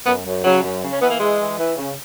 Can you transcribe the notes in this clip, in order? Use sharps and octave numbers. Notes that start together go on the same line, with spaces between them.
F#2 B3
F#2
C#3 F#3
F#2
C#3
C#4
E3 B3
A#3
E3 G#3
E3
E3
C#3